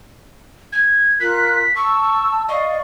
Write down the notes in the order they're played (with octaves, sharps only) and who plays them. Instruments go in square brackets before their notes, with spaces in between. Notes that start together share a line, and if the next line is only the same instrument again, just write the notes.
[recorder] G#6
[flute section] F4 A#4 F#6 [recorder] B6
[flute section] A5 E6 [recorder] C#6
[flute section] D5 F5 C#6 [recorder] D#5